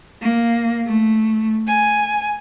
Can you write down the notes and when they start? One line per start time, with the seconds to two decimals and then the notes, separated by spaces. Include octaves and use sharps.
0.21 A#3
0.85 A3
1.67 G#5